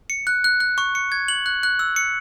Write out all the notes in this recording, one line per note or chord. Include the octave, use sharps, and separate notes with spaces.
C#7
F#6
F#6
F#6
C#6
C#7
G#6
F#7
F#6
F#6
E6
C#7